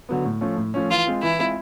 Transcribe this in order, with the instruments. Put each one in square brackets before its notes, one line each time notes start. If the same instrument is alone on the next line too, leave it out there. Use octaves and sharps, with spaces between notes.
[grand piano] D3 F#3 B3
A2
F3 A3 C#4
A2
F3 A3 C#4
[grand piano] E3 [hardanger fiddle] F4
[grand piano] G#3 C4 F4
[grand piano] E3 [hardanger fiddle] E4
[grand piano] G#3 C4 F4